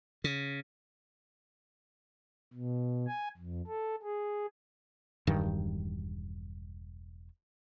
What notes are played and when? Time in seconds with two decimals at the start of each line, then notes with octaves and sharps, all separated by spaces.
0.24 C#3
2.53 B2
3.07 G#5
3.37 F2
3.68 A4
4.03 G#4
5.27 E1 G2 D#3